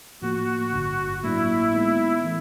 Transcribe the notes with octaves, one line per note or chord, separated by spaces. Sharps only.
A2 F3 A#3 F#4
G#1 G2 D3
A2 F#3 A#3 D4 E4
D#3 G#3 B3 D#4
E3 A3